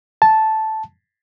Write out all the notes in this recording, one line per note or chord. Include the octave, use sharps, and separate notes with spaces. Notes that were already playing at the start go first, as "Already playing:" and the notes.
A5